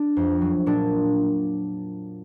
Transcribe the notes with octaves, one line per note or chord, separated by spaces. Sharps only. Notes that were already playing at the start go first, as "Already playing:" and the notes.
Already playing: D4
F2
F#3
A#2 D4